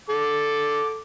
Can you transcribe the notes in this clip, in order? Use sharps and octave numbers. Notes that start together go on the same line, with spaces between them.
A4 D6